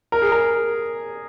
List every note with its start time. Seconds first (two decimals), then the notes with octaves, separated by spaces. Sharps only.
0.12 A#4
0.22 G#4
0.32 A#4